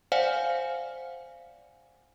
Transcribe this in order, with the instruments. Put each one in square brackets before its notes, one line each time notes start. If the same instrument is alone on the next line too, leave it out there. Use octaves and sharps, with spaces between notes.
[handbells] C5 D5 F5 F#5 G#5